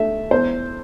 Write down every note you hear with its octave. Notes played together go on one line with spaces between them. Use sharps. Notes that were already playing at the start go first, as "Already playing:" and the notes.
Already playing: A3 E5
E2 C5